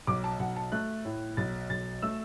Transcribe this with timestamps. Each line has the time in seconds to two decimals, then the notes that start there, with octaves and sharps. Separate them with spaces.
0.07 B1 D6
0.24 A5
0.39 B1 F#5
0.56 A5
0.72 A3 F#6
1.05 A2
1.37 B1 A6
1.70 B1 A6
2.02 A3 E6